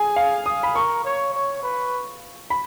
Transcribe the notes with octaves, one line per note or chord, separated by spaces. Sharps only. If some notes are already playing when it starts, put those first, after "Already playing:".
Already playing: G#4 G#5
F5
D#6
B5
A#4 C#6
C#5
C#5
B4
B5